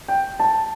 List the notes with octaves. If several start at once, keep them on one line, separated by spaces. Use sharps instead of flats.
G5
A5